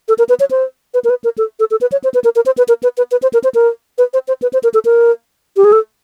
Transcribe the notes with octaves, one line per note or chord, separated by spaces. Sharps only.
A4
A#4
B4
C#5
C5
B4
A#4
B4
A#4
A4
A4
A4
B4
C#5
C5
B4
A#4
A#4
C5
B4
A#4
B4
B4
B4
C5
A#4
C5
A#4
B4
C5
C5
B4
C5
A#4
A4
A#4
G4
G#4
A4